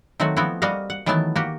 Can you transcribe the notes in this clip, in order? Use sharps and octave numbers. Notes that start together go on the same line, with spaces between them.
D#3 F#3 A3 C4 F#4
F3 B3 C4 E4 F#4
G3 A#3 F#4 D#5 F5
F#5
D#3 E3 F#3 A3 B3 A5
A#3 F#4 G4